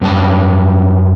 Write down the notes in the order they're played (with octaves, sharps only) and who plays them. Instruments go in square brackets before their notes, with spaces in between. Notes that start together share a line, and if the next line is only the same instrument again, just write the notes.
[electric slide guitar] F#2 G3 G5 A5